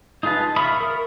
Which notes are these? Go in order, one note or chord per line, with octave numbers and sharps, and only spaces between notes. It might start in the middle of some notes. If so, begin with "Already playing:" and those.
D#4 F4 G#4 B4 A5
E5 F5 B5 C#6 D#6
A#4